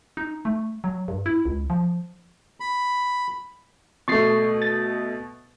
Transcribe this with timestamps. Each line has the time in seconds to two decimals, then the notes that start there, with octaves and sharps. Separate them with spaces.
0.17 D#4
0.45 A3
0.84 F#3
1.08 G2
1.26 E4
1.46 C#2
1.70 F3
2.60 B5
4.08 B2 A3 C#6 A6 C7
4.62 A6